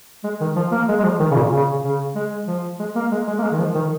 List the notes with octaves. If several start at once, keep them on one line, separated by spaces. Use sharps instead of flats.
G#3
D#3
F3
A#3
G#3
G#3
F3
D#3
C#3
A#2
C#3
C#3
G#3
F3
G#3
A#3
G#3
G#3
A#3
G#3
D#3
F3
D#3